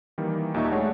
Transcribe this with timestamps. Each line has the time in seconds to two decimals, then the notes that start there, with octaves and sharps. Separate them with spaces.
0.18 D#3 E3 G3 A#3
0.54 D#2 A#2 D#4 E5 C#6
0.72 G#3 A3 D4 G#4 C#5 F#5